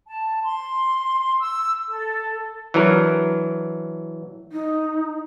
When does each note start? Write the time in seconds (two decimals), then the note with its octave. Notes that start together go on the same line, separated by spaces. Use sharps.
0.08 A5
0.44 C6
1.40 E6
1.88 A4
2.74 E3 F#3 D4 A#4
4.52 D#4